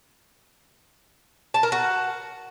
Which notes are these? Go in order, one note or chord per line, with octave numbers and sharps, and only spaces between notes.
A5
A#4
F#4